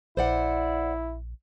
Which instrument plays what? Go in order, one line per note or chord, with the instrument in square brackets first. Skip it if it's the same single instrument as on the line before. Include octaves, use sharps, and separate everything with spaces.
[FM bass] A#1 [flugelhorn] E4 [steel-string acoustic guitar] C5 D5 F#5